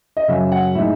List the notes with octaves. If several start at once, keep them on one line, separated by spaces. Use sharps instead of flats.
D#5
F#2 C#3 F#3 E5
F#5
A2 G#3 D#4 E5